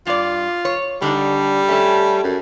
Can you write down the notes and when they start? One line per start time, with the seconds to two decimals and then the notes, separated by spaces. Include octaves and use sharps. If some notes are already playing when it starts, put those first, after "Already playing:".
0.07 G2 F4 D5
0.65 C#5
1.02 D3 G3 D4 D#4
1.68 A3 C#4 A4
2.24 F#2